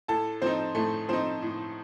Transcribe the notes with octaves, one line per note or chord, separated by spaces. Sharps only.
A2 A4 A5
F3 C4 D#4 C5
A2 A3 A4
F3 C4 D#4 C5
A2